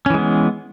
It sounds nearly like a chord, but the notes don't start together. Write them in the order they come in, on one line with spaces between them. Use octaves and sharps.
C#4 E3 G#3 B3